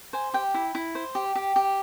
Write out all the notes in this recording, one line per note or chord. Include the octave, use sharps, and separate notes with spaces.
C5 G#5
G4 G5
E4
E4
C5
G4
G4
G4